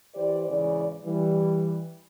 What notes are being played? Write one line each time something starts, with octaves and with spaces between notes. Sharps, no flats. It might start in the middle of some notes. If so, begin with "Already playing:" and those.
E3 G4 C5 D5
G#2 C#3 E3 D5
E3 G3